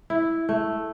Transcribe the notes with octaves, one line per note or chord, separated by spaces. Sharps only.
E4
A3